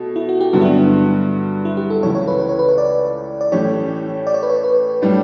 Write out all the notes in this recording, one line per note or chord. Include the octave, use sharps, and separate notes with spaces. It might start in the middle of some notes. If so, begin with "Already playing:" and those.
Already playing: B2 A3
E4
F#4
G4
G2 D3 F#3 B3 F#4
E4
D4
D4
E4
G4
A4
C#2 C#3 E3 A3 E4 C#5
C#5
B4
B4
C#5
B4
C#5
D5
D5
A2 E3 A3 C#4 G4 C#5
D5
C#5
B4
C#5
B4
A2 G3 D4